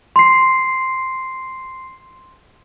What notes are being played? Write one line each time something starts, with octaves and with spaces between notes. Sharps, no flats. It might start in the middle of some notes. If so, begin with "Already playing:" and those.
C6 C7